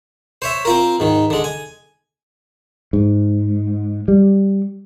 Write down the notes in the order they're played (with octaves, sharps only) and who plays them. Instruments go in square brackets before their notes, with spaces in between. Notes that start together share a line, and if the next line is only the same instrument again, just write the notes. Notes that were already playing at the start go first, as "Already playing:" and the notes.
[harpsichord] C5 C#5 E5
C4 F4 A#4
G#2 D#3
D3 G#3
G#5
[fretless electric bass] G#2
G3